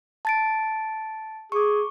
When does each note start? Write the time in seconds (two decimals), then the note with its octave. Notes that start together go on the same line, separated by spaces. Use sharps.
0.25 A5 A6 D7
1.52 G#4 C#6 D6